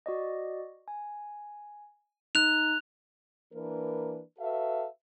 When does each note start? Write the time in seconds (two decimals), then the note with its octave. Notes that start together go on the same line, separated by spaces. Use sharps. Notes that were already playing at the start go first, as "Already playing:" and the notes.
0.06 F#4 D5 D#5
0.88 G#5
2.35 D#4 F#6 F7
3.53 E3 A#3 D4 A#4 B4
4.39 F#4 A4 B4 E5 F5